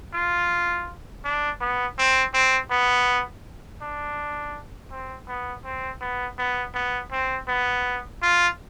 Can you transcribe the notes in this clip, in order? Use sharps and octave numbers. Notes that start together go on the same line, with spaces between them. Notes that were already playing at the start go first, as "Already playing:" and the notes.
F4
D4
B3
C4
C4
B3
D4
C4
B3
C4
B3
B3
B3
C4
B3
F4